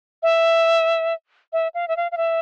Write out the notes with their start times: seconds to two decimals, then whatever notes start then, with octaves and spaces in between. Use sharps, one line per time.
0.23 E5
1.53 E5
1.74 F5
1.88 E5
1.97 F5
2.11 F5
2.17 E5